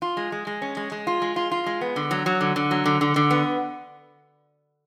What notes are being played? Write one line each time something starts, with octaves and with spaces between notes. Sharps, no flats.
F4
G#3
G#3
G#3
C#4
G#3
G#3
F4
G#3
F4
F4
G#3
B3
D3
F#3
F#3
D3
D3
F#3
D3
D3
D3
B3